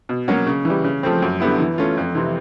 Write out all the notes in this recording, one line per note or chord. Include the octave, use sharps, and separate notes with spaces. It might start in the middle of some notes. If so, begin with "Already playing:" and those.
B2
F#3 A#3 C#4 F#4
C#3
E3 G3
C#3
F3 A3 C4
F#2
D3 G3 B3 E4
E3
A3 C#4 F4
F2
C3 E3